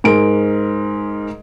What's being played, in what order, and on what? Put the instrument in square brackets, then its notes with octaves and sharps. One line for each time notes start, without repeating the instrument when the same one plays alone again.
[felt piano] G#2 G#4 A#4 D7